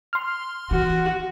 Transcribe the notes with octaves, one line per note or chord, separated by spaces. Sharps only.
C6 F6
E3 F#4